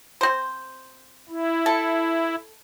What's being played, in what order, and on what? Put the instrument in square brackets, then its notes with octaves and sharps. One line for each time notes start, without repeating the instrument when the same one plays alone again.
[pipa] C4 C5
[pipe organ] E4
[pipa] A4